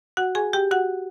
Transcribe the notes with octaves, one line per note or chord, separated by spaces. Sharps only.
F#4 F#5
G#4 G#5
G4 G5
F#4 F#5